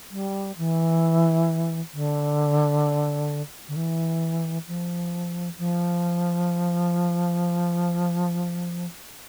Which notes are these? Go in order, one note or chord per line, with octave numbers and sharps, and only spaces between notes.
G3
E3
D3
D3
E3
F3
F3